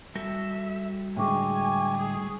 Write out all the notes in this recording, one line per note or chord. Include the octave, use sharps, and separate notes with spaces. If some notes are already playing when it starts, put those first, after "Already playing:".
G3 F#4 A4 E5
A2 D3 G#3 G5 G#5 C#6 D6
G#4